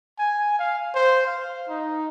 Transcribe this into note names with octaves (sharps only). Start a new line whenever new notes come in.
G#5
F5
C5
F5
D#4